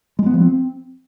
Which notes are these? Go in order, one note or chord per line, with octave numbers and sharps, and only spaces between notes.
G#3
B3
F3
C4